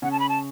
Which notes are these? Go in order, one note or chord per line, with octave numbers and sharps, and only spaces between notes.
C#3 C#4 F#5
A5
B5
A5